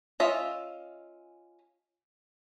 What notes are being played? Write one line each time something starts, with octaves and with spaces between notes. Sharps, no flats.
C#4 F4 D#5 E5